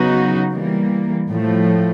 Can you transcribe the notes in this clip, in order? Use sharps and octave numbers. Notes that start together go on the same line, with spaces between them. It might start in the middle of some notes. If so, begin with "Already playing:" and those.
Already playing: C#3 F#3 B3 D#4 F#4
E3 G3 A#3
A2 F3 A3